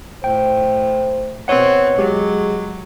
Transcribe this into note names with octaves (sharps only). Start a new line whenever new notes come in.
A2 C5 G5
B2 C4 B4 C#5 F#5
F#3 G#3 G4